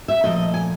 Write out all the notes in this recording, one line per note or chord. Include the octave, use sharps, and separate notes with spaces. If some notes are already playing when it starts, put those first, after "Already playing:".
E5
A#2 F3 A3 D#5
G#5